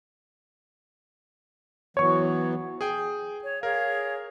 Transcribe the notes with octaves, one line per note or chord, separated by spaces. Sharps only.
E3 F#3 B3 C#5 C#6
G#4 G5
C#5
G#4 A#4 C#5 F5